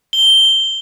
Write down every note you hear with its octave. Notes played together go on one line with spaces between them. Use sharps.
G7